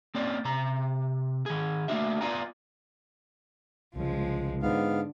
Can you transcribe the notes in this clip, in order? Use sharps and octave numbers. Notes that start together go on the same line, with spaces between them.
A#3 C4 C#4 D5
C3 A#5
D#3 G#4
A3 A#3 D4 F#4 E5
B3 F4 D5 G#5 A#5
C2 C#3 F3 G#3
G#2 D3 B3 F5